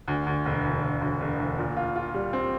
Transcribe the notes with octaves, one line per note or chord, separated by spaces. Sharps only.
D2
D2
E1
D2
E1
D2
E1
D2
A#2
F4
F4
G3
C4